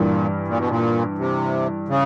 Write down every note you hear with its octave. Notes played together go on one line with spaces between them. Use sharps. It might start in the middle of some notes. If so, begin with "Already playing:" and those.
Already playing: G2 A#2 E3 G3
A#2
B2
A#2
C3
C#3